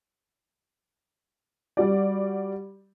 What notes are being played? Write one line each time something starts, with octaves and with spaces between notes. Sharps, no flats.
G3 F#4 D5